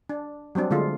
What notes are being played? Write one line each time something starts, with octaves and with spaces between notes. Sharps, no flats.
D4
F#3 G3 C4 D4
D3 G#3 A3 F4